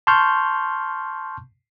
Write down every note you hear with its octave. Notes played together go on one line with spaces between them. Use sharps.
A5 C6 C#6 F6 G6